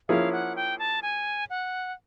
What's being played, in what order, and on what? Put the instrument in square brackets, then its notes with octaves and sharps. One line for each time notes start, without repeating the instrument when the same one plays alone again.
[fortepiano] F3 A#3 C#4 E4 G#4 [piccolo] F5
[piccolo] F#5
G5
A5
G#5
F#5